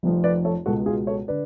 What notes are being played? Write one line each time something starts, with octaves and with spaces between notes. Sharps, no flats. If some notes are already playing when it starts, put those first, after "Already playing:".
F1 F2 F3
B4 D5
A4 C#5
C#2 B2 G#3 F#4 A4
F4 G#4
A4 C#5
D3 B4 D5